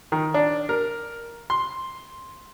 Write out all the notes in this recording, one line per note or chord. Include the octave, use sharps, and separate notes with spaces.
D#3
D4
A#4
C6